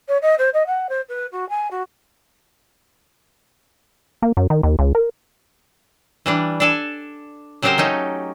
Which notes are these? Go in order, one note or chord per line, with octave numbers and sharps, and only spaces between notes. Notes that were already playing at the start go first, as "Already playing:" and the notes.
C#5
D#5
C5
D#5
F#5
C5
B4
F#4
G#5
F#4
A#3
F#2
D#3
D#2
C#2
A#4
E3 G3 D4
D4 A4 G#5
C#3 F#3 C4 G4 A#4 C5
A3 C#4 D#4